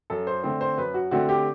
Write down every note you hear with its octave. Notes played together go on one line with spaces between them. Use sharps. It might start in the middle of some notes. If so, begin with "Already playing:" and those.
F#2 A4
C5
D3 A3 C4 C5
C5
F#2 B4
F#4
D3 A3 C4 F#4
G4